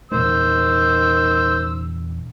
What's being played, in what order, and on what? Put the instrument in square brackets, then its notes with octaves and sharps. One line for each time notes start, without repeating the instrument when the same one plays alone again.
[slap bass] E2 A#2 G#3 [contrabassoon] D#3 [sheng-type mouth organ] C5 [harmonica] E6